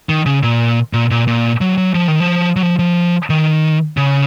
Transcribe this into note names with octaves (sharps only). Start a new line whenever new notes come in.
D#3
C#3
A#2
A#2
A#2
A#2
F#3
F#3
F3
D#3
F3
F#3
F3
F3
D#3
C#3